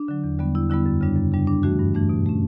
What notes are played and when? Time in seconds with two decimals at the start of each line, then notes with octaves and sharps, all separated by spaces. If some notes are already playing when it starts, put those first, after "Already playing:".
Already playing: D4
0.08 D3 F#3
0.24 E2
0.39 D3 G3 B3
0.55 E2 E4
0.70 D3 G3 B3 E4
0.86 F#2
1.01 C#3 G3 D4
1.16 F#2
1.32 C#3 G3 D4
1.47 G2 D4
1.63 E3 A3 D4 F#4
1.79 G2
1.94 E3 A3 D4
2.09 B2
2.26 A3 C#4